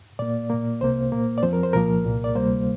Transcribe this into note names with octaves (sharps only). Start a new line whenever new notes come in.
A#2 A#3 D5
A#2 A#3
C2 C3 A#3 C5
A#2 A#3
D5
F2 F3 C4 C5
A#4
C5
C2 A#2 F3 A#3 A#4
C2 A#2 A#3
D5
D2 C3 G3 A#3 C5